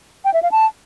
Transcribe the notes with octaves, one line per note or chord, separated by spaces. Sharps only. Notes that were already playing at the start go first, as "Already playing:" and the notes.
G5
E5
F5
A5